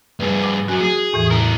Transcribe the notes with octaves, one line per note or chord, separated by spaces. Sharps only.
G2 G#4 B4
D6
F#2 F#4 G#5
G#4
E2 A2 E3
E4 A#4